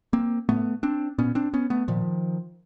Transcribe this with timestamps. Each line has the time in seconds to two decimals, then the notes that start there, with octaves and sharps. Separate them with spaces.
0.13 A#3 C4
0.49 A2 A3 B3
0.83 C4 D4
1.19 A#2 B3 C#4
1.35 C4 D4
1.54 B3 C#4
1.70 A3 B3
1.88 A#2 D#3 F3